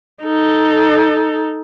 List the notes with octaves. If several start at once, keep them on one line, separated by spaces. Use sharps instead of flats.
D#4 A4